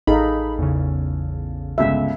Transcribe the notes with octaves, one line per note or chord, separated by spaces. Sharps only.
A1 D#4 G#4 A4 F5 B5
E2 C#3
G1 C#2 E5